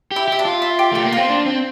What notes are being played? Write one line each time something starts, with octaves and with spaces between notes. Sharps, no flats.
E4 G4
E4 G4
D4
F4
E4
G4
A3 G4
A#3
C4 F4
D4
C4